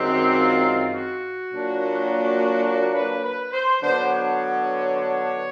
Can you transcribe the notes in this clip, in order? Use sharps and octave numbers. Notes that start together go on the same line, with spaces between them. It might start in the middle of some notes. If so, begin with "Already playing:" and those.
Already playing: F#2 D#3 G#3 C4 G4
F4
F#4
A#2 F#3 A#3 D4
F#4
B4
B4
C5
D3 F#3 B3 D4 C5
C#5
C#5